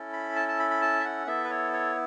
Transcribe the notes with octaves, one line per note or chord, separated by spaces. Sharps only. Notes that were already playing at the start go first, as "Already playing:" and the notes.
Already playing: C#4 E4 A4
B5
A5
A5
B5
B5
A5
E5
F#5
B3 E4 A4 E5
B4
C#5
C#5